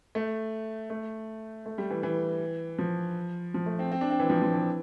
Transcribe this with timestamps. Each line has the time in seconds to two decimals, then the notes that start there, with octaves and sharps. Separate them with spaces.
0.15 A3
0.90 A3
1.66 A3
1.78 G3
1.90 E3
2.03 E3
2.79 F3
3.54 F3
3.66 A3
3.79 C4
3.92 C4
4.01 D4
4.11 C4
4.19 E3
4.30 F3
4.42 F3
4.54 E3